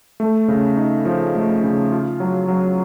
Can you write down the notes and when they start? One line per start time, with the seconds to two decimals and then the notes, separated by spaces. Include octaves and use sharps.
0.20 A3
0.48 C#3
0.77 D#4
1.05 F3
1.35 A3
1.64 C#3
1.92 F4
2.20 F#3
2.48 F#3